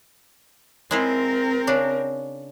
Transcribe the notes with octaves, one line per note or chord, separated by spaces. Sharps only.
G#3 C4 E4 F4 A#4
C#3 D4